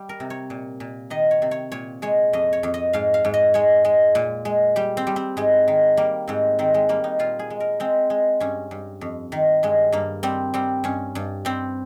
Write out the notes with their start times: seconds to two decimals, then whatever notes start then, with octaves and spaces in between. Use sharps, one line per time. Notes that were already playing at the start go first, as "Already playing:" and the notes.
Already playing: G3
0.09 A#4
0.20 C3
0.30 C#5
0.50 A#2
0.80 A#2
1.10 D#3 D#5
1.31 C#5
1.42 C3
1.51 C#5
1.72 A#2 C#5
2.02 G#3 C#5
2.33 F2 D#5
2.53 C#5
2.63 F2
2.74 D#5
2.93 G#2 F5
3.14 F5
3.25 G#2
3.34 D#5
3.54 G#3 C#5
3.85 G#3
4.15 A#2
4.45 G#3
4.76 G3 G4
4.97 C4
5.07 G3
5.16 C4
5.37 G#2 G#3
5.68 D#3
5.97 G3 A#3
6.28 G#2 C4
6.59 D#3 C4
6.74 G#3
6.89 G3 A#3
7.04 D#4
7.19 A#2 F4
7.39 G#4
7.50 G#3
7.60 A#4
7.80 G#3 C4
8.10 G#3
8.40 G2 C#4
8.71 G2
9.01 F2
9.32 D#3
9.63 G2 G#3
9.92 G2 A#3
10.23 G3 C4
10.54 G3 C4
10.84 G2 C#4
11.15 G2
11.45 G3 C4